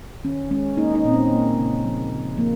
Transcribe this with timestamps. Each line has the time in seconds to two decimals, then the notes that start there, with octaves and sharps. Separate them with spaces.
0.24 D#3 C#4
0.51 G#3 C#4
0.77 A#3 D#4
0.95 D#4
1.04 A#2 C4
1.13 C#4
1.31 A#3
1.58 C#3
1.84 F3
2.11 C#3
2.38 F3 A#3